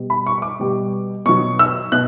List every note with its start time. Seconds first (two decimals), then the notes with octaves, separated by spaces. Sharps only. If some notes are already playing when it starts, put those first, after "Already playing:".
Already playing: B2 G3
0.10 B5
0.26 C#6
0.38 C#6
0.42 D6
0.60 B2 G3
1.25 B2 F#3 C#6
1.59 E6
1.92 B2 F#6